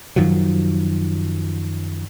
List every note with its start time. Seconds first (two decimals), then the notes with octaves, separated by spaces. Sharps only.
0.16 F#2 D#3 F3 F#3